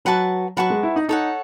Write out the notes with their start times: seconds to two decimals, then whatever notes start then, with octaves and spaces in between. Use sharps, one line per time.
0.05 F#3 B4 F#5 A5 C#6
0.57 F#3 B4 F#5 A5 C#6
0.70 G#3
0.83 E4
0.96 D#4
1.09 D#4 A4 C#5 F#5